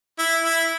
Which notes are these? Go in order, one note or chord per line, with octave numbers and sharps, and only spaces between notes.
E4
E4